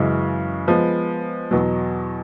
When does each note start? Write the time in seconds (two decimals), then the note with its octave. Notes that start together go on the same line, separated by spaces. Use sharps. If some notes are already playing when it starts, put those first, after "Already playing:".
Already playing: F#2 C#3 E3 G#3
0.68 F3 G#3 B3
1.51 E2 B2 F#3